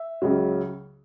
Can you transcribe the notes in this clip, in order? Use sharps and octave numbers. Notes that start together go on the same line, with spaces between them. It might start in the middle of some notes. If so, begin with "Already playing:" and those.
Already playing: E5
C#2 C#3 F#3